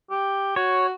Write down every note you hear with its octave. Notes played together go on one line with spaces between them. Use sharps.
G4
F#4 C#5